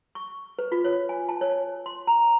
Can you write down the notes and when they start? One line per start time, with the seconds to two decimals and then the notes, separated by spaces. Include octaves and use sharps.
0.15 C#6
0.59 B4
0.72 F4
0.84 C#5
1.09 G#5
1.29 A5
1.41 C#5
1.86 C6
2.07 A#5